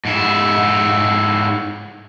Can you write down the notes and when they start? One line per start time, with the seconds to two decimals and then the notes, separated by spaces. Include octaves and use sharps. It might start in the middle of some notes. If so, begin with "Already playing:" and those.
0.05 G#2 E4